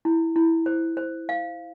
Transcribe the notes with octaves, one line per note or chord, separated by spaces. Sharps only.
E4
E4
C5
C5
F5